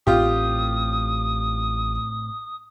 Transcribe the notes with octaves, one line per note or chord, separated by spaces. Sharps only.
A1 A2 C4 F4 G4 D#6